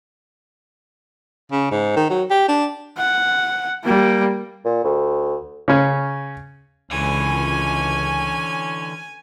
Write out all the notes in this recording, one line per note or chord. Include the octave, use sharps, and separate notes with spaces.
C#3
G#2
D#3
F#3
G4
D4
F#5
G3 A#3
A#2
D2
C#3 C#4
C#2 D3 E3 C#4 G#5